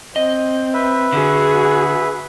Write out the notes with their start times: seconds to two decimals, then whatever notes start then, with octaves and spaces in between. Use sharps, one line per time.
0.16 C4 D#5
0.74 B4 E5
1.12 D3 F#4 G#4